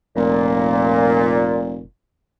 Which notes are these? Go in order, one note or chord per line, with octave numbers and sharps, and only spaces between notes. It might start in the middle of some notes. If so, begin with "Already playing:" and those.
F1 A#2